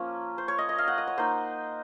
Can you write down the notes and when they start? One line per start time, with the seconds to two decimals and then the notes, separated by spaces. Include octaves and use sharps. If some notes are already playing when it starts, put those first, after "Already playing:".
Already playing: F3 A#3 C#4
0.38 C5
0.48 C#5
0.58 D#5
0.69 D#5
0.78 F5
0.88 F#5
0.98 D#5
1.08 C#5
1.18 A#3 D#4 C5